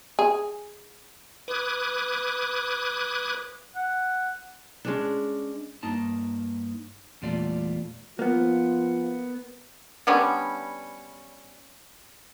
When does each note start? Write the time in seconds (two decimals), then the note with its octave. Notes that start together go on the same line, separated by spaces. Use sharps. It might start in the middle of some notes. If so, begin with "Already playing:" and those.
0.19 G#4
1.48 B4 D6 D#6 F#6 G#6
3.76 F#5
4.85 G#3 C#4 D4
5.83 G2 A#3 D#4 A5
7.22 E2 A#2 G3 A3 F4 D5
8.19 F3 A#3 B3 F4
10.07 D3 G3 B3 C#4